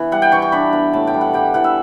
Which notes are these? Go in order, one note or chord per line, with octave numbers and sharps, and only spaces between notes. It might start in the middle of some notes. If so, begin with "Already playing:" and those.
Already playing: E3 B3
G3 F#5
G5
E3 C#6
C#6
D4 B5
B3
A2 A5
G5
G3
F#5
G3 G5
E3 F#5
E5